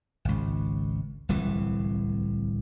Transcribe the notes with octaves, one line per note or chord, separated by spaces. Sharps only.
G#1 C#2
D1 C2 E3